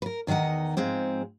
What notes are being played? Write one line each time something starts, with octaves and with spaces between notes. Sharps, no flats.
A#4 B4
E2 D#3 F3 D#4 F#5
G#2 F3 G#3 C4